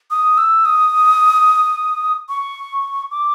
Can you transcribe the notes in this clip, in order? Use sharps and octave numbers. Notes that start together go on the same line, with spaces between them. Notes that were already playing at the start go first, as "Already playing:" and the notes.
D#6
E6
D#6
C#6
D6